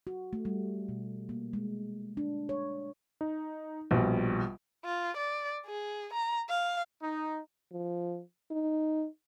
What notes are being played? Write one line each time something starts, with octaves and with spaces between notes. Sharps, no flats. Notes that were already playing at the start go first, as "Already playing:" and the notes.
F#4
A3
G3
B2
A#3
G#3
D4
C#5
D#4
A#1 B2 G3
F4
D5
G#4
A#5
F5
D#4
F3
D#4